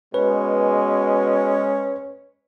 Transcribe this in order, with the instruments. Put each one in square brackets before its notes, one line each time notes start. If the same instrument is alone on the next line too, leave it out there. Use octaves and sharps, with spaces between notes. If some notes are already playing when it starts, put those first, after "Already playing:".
[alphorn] B2 [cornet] G#3 [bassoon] C#4 [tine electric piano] B4